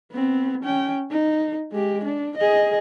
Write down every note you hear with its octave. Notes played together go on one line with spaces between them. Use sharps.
B3 C4
C#4 G5
D#4
G#3 G4
D4
G#4 D#5